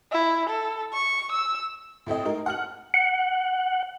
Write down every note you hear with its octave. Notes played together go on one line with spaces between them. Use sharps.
E4
A4
C#6
E6
A2 A3 C4 D#5
G#3 D#4 A#4
F#5 F6 F#7
F#5